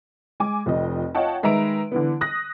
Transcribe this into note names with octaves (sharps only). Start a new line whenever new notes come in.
G#3 G#5 D6
F1 F2 D#5
F4 C#5 D#5 F#5 G5 A5
D#3 G#3 B4 E5 A#5 D7
D3 E3 B3
D#6 F#6 A#6